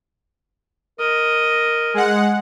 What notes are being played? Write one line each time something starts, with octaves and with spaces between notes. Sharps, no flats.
A#4 D#5
G#3 F#5